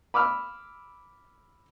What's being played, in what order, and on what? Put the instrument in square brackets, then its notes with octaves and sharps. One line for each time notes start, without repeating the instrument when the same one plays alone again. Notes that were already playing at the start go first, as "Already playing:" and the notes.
[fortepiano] B5 D6 E6 F6